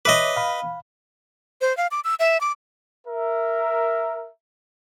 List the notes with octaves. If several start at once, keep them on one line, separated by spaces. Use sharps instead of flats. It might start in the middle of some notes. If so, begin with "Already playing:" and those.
B4 C#5 D#5 E5 D6
F5 B5
C5
F5
D6
E6
E5
D6
A#4 E5